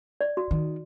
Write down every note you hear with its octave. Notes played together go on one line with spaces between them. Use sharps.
D5
F#4
D#3